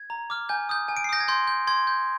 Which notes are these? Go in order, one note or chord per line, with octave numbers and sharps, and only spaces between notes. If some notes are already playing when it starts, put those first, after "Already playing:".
Already playing: G#6
A#5
D6 F6
G#5 G6
D#6 G6
G#5
D7
C7
D#6 G6 A#6
G#6
C6 G6
G6
C6 G#6
G6